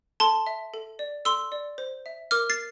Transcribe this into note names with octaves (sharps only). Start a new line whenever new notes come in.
A4 A5 C6
E5
A4
D5
A4 C6 E6
D5
C5
E5
A#4 D6 F6
A6 C7